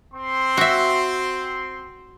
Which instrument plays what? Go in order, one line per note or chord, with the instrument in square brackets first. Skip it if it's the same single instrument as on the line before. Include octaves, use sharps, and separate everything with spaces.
[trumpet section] C4 C6
[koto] F#4 E5